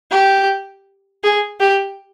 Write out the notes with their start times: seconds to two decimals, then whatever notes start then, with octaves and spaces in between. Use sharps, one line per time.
0.11 G4
1.23 G#4
1.61 G4